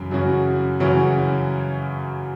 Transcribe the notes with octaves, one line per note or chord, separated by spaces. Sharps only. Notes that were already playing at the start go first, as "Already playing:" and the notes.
Already playing: F#2 C#3 E3 C#4 F#4
F#2 C#3 E3 C#4 F#4
F#2 C#3 E3 C#4 F#4